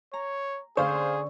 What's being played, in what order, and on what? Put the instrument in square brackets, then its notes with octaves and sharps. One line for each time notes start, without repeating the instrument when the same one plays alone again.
[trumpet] C#5 [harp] A#5
[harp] D3 C#4 [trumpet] G#4 [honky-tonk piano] C5 F5 [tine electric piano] C#6